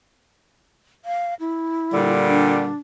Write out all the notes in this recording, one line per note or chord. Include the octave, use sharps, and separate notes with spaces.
F5
E4
A#2 D3 G3
D4